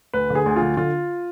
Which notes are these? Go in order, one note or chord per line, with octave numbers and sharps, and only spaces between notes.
D2 B4
D3
G#4
D2
F4
D3
D3 F4